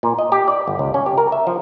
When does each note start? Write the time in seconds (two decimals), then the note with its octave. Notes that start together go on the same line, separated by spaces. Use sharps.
0.03 A#2
0.19 D#5
0.32 G4
0.48 D5
0.67 G1
0.79 C#2
0.94 C#4
1.06 G4
1.18 A#4
1.32 E5
1.47 F3